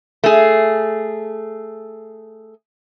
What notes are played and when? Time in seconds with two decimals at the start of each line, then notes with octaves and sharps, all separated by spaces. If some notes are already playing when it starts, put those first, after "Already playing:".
0.24 A3 G#4